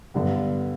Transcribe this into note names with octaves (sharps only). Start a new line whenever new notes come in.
G2 D3 G3 B3